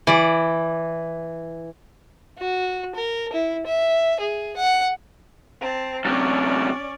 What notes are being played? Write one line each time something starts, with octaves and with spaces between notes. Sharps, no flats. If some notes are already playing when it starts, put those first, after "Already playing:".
E3 D5
F#4
A#4
E4
E5
G#4
F#5
C4 A5
F#2 C3 C#4 D5